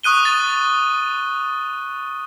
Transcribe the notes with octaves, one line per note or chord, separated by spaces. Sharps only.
C#6 D#6 F#6 D#7 G7
A6